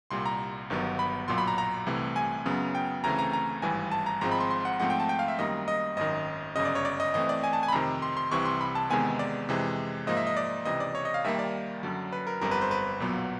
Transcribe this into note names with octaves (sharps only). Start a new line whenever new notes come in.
C2 A#2 G3 C6
A#5
G1 G2 D#3 F#3 B3
B5
B1 A#2 F#3 C6
B5
A#5
A#5
C2 C3 E3 A3
G#5
F#2 C#3 F#3 B3
G5
D2 C#3 E3 A3 C4 A#5
A#5
A#5
G#1 G2 E3 G3 G#5
A5
A#5
G#1 G#2 F3 G#3 C4 A#5
B5
C6
C6
F#5
G#2 F3 A3 C4 F#5
G5
A5
G5
F5
E5
F#2 D#3 G3 A#3 D#5
D#5
G#1 F#2 D#3 D#5
G1 F#2 C#3 D#5
D5
C#5
D5
D#5
A2 E3 A3 C4 D#5
D5
G#5
A5
G#5
B5
F2 C3 D#3 A#5
C6
C6
C2 C3 E3 C#6
C6
B5
A5
E2 C3 D#3 G#3 B3 G#5
D5
F2 C3 E3 G#3
G#2 F3 A#3 D#5
E5
D#5
D5
C#2 C3 E3 D#5
D5
C#5
D#5
F5
D#2 D#3 G3 A#3 E5
D5
F#2 D3 F#3
B4
A#4
G1 F2 D3 G3 A#4
B4
C5
B4
B1 A#2 F#3 B3